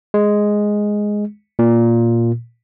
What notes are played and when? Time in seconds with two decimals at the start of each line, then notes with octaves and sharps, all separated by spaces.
0.14 G#3
1.59 A#2